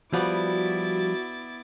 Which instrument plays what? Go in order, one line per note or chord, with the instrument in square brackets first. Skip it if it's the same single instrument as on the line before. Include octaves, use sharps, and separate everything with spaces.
[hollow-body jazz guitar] F3 G3 [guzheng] B3 D5 [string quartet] E4 D6 A6 [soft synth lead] F#4